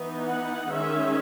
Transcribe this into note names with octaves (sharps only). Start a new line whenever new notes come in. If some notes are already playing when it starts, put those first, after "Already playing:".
Already playing: E3 B3 D#4
F#5
D#3 G#3 C#4 E5